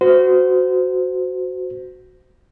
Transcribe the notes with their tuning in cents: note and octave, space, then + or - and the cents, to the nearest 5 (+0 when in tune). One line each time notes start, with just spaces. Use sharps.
F#4 +0 C5 -30